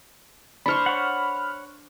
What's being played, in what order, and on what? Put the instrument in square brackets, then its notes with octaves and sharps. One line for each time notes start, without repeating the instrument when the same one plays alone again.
[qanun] D4 C5 C#6 [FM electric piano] B5 F6
[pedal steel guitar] C#5 F#5